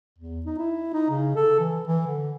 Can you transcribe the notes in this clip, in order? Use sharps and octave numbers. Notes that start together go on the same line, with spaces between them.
E2
D#4
E4
D#4
C#3
A4
E3
E3
D3